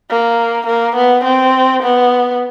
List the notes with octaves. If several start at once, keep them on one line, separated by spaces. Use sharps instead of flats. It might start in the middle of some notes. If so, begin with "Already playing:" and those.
A#3
A#3
B3
C4
B3